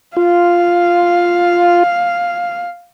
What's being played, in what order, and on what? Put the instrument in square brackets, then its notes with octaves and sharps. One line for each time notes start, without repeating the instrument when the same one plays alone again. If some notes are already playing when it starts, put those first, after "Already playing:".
[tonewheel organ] F4 [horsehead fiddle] F5